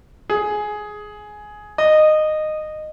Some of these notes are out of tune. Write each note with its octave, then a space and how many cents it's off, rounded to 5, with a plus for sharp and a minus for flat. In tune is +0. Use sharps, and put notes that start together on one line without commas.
G#4 +10
D#5 -15